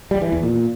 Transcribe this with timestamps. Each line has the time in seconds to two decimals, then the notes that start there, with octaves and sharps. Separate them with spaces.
0.11 G3
0.22 E3
0.32 E2
0.43 A#2